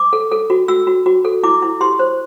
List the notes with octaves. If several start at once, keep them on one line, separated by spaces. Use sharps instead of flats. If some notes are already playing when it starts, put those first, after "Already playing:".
Already playing: D6
A4
A4
F#4
F#4 E6
F#4
F#4
A4
E4 D6
E4
G4 C6
C5